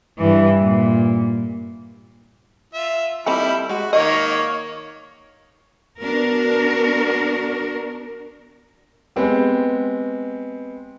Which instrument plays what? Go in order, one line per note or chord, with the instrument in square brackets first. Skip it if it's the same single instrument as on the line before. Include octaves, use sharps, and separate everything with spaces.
[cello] G2 E3
A#2
[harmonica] F4 E5
[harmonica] G3 E4 [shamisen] C4 D#4 A4
[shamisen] G#3 [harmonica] F#4
[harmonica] D#3 A#3 C#5 [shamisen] D#5
[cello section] B3 D4 F#4 A#4
[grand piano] G#3 B3 C4 G4